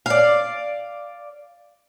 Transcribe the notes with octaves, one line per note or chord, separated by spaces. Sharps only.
D5 F5